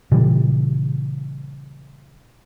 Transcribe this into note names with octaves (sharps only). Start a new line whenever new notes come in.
A#2 C#3 E3 G3